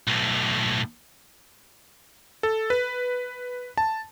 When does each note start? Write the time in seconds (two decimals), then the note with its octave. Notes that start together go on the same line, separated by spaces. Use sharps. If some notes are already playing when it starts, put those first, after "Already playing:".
0.07 B1 A2
2.43 A4
2.70 B4
3.78 A5